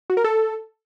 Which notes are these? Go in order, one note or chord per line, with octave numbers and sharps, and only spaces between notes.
F#4
A#4
A4